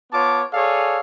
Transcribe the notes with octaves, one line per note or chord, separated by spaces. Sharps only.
B3 F4 C#5 A5 D6
G#4 A4 C#5 D5 F5